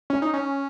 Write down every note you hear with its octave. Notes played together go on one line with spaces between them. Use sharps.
C#4
D#4
C#4